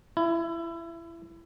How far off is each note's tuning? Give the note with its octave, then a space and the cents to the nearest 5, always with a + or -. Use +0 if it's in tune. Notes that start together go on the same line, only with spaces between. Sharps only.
E4 +25